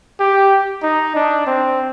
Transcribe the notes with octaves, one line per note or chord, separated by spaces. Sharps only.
G4
D#4
D4
C4